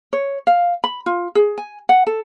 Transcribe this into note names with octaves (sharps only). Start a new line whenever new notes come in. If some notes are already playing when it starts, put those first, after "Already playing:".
C#5
F5
B5
F4
G#4
G#5
F#5
A4